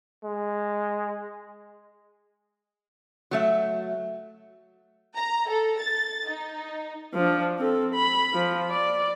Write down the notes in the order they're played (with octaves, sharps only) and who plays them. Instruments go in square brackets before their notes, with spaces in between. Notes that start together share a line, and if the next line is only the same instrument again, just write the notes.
[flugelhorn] G#3
[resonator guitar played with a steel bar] F#3 A3 E5
[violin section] A#5
A4
A6
D#4
[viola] F3 D4
C4 A4
B5
F3
D5